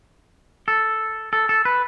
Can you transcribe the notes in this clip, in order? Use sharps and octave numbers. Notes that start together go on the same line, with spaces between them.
A4
A4
A4
B4